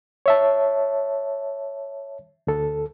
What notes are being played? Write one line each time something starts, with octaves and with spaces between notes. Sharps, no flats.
C#5 E5 A5
D2 A4